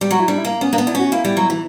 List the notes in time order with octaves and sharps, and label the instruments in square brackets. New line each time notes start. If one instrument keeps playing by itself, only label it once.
[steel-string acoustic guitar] G3
[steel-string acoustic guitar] F#3 [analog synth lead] F#4
[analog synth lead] E4
[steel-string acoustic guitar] G3 [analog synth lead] D4
[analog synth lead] E4
[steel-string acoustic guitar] A#3
[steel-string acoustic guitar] B3 [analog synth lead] C#4
[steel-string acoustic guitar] A#3 [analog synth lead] D4
[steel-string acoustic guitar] B3
[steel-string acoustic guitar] D4 [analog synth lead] E4
[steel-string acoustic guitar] C#4 [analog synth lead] F#4
[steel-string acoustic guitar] A#3 [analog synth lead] E4
[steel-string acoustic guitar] G3
F#3
E3